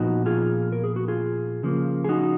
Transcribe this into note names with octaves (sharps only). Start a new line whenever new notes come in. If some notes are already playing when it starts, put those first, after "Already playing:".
Already playing: A#2 F3 B3 D#4 F#4
F4 G#4
A#4
G#4
F#4
F4 G#4
C#3 F3 A#3
G#4
D#4 F#4